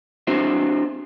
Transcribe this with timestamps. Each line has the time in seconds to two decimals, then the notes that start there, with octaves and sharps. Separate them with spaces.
0.27 C4 D4 F#4 C5 E5